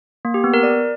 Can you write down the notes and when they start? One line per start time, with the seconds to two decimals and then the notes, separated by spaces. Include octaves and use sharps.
0.25 A#3
0.34 G4
0.44 B3
0.54 A#4
0.63 D5